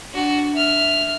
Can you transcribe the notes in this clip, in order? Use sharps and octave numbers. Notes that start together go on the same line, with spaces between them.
D4 F#4
E5 F6